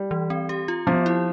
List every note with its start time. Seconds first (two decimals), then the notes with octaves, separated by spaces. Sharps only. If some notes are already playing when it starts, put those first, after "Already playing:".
Already playing: G3
0.11 E3
0.30 C4
0.49 G4
0.68 F4
0.87 F3 B3
1.06 E4